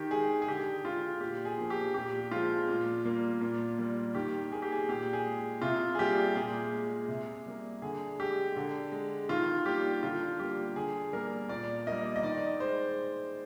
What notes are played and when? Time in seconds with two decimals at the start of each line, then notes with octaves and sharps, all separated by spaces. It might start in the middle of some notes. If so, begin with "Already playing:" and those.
Already playing: D#3 G4
0.10 G#3 G#4
0.42 G#4
0.47 D3 G4
0.84 G#3 F4
1.21 A#2 G4
1.45 G#4
1.58 F3 A#3
1.70 G4
1.94 A#2 G4
2.31 F3 G#3 F4
2.68 A#2
3.05 G3 A#3
3.41 A#2
3.79 G3 A#3
4.15 D#3 G4
4.52 A#3 G#4
4.62 G4
4.72 G#4
4.89 A#2 G4
5.13 G#4
5.26 G#3
5.62 C3 F4
5.95 G#4
5.99 G3 A#3 G4
6.35 A#2 G#4
6.73 G#3
7.08 C3
7.46 G3 A#3
7.82 D3 G#4
8.19 G#3 G4
8.56 D3
8.92 G#3
9.29 D#3 F4
9.66 G3 A#3 G4
10.03 D3 F4
10.40 G3 A#3 G4
10.76 D3 G#4
11.13 G3 A#3 A#4
11.49 A#2 D5
11.87 G3 A#3 D#5
12.16 D#5
12.23 D#3 D5
12.60 G#3 C5